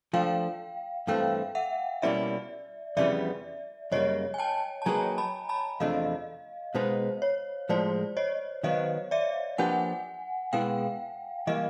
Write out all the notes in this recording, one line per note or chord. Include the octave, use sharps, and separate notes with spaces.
F3 A3 D4 F5 G5
G2 E3 A3 C4 F5 G5
E5 F#5
B2 G3 A#3 C#4 E4 D5 E5
F2 C#3 E3 G3 B3 D5 E5
F#2 C#3 E3 G3 A#3 C#5 D#5
G#5
G5 A5
A5
F#3 A#3 D#4 G#4 B4 G#5 A#5
A5 B5
A5 B5
E2 C3 F3 A3 D4 D#5 F5
B2 G#3 B3 D#4 C5
C#5
A2 F3 G#3 C5 D5
C#5 D#5
D#3 F#3 B3 D#5 F5
D5 E5
F3 A#3 D4 G4 B4 F#5 G#5
B2 G#3 B3 E4 F5 G5
E3 G3 A#3 D#5 F5